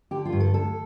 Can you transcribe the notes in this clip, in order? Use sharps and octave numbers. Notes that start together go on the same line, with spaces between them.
D3 G4
F4
G2
A4
D2 A4